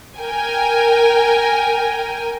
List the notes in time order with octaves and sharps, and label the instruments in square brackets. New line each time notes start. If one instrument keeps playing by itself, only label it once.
[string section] A#4 G5 G#5